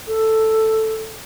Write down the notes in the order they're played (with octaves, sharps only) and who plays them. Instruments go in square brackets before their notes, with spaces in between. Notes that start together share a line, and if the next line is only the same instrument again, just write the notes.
[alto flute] A4